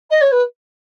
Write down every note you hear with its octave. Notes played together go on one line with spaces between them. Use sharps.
D#5
C#5
B4